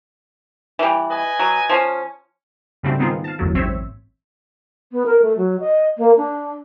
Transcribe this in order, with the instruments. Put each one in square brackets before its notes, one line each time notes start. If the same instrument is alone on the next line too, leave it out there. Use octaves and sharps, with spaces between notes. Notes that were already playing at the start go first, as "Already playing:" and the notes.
[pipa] E3 G3
[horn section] B4 D#5 G#5
[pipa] F#3
F3 C#4
[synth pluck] G#2 C#3 G3 A3 C4 F#4
D#3 B3 C4 D#4 F4 G#4
F5 A5
G1 E2 A2 F#3
A1 G#2 C4 C5 C#5 E5
[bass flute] B3
A#4
A3
F#3
D#5
A#3
D4